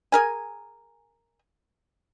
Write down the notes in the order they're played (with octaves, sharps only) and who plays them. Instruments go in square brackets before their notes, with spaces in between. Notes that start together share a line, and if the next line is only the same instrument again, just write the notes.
[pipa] G#4 A#4 G#5